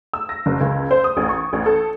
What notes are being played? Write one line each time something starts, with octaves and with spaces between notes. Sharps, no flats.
E6
A#6
F#1
C#2
C5
D#6
A1
C#6
A1
A4